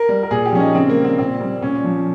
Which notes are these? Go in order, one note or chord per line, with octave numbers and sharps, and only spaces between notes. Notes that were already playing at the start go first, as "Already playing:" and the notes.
Already playing: A#4
G3
A#4
A#2 G#4
G4
F3 C#4
D#4
C#3 C4
A#3
G3
C4
A#2 C4
G3
A#2 C#4
F3